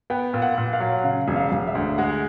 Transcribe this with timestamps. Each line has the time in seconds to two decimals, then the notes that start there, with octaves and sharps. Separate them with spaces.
0.10 B3 G5
0.34 A#2
0.42 F#5
0.58 A#2
0.73 F5
0.80 F#3
1.04 C#3 F5
1.28 E1
1.36 F5
1.52 E1
1.67 E5
1.75 D2
1.98 G#3 F#5